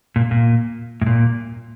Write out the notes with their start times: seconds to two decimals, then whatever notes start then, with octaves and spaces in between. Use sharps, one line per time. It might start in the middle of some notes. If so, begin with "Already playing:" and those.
0.16 A#2
0.31 A#2
1.02 A2
1.06 A#2